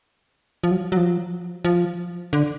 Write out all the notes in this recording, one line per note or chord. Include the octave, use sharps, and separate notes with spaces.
F3
F#3
F#3
F3
F3
D3